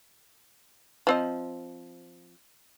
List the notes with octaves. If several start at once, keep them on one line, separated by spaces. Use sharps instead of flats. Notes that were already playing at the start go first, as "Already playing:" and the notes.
F3 C4 D#5